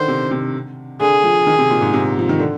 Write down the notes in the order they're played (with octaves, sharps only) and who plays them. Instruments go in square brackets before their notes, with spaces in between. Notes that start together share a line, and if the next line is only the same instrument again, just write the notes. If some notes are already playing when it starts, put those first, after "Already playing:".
Already playing: [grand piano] D3 D#3 [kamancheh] C5
[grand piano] C3
C3
[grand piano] D3 [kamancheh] G#4
[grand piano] F3
D#3
C3
A#2
G#2
C3
F3
D#3
D3